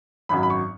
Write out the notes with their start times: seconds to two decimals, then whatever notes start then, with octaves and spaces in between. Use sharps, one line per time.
0.29 G#1 F#2 F#3 B5
0.43 B5
0.50 C#6